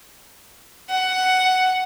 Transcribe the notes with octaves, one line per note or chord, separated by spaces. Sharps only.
F#5